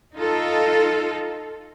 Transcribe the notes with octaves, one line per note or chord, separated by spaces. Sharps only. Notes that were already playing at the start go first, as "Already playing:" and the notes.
D#4 F4 A4